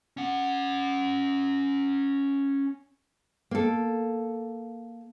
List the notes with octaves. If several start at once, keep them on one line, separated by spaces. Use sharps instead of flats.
C#4 F#5
A#3 A4